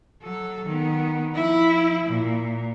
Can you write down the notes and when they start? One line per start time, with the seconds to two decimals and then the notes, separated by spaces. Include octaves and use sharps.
0.22 F#3 A4
0.65 D#3 B3
1.34 F3 E4
2.04 A#2